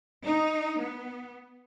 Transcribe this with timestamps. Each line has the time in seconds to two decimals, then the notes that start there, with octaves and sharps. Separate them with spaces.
0.25 D#4
0.80 B3